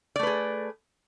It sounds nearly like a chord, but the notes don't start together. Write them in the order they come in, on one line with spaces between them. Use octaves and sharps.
D5 A3 B4 G#4